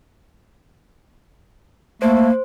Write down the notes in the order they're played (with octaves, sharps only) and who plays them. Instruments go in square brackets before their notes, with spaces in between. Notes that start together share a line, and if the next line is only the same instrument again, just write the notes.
[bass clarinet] A3 [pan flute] A#3 [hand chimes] C5